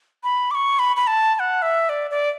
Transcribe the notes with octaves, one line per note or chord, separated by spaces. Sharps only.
B5
D6
C#6
B5
B5
A5
A5
F#5
E5
D5
D5